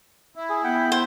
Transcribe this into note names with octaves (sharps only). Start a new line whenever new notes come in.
E4
G#4
B3 F#5 G5 B5
C5